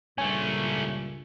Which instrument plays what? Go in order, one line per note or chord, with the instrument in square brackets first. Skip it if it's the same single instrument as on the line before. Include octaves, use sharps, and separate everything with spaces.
[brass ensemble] C#2 G2 A#2 [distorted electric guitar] A3 C#4 [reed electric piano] G#5